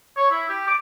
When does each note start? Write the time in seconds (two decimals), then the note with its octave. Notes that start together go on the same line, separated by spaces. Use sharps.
0.17 C#5
0.30 E4
0.49 G4
0.67 D6